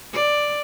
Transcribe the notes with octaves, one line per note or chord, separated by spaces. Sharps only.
D5